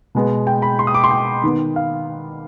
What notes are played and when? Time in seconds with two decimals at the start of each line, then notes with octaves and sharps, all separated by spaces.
0.15 B2 G#3 B3
0.47 G5
0.62 B5
0.79 C6
0.87 D#6
0.94 D6
1.04 C6
1.11 G5
1.43 D#3 B3
1.76 F5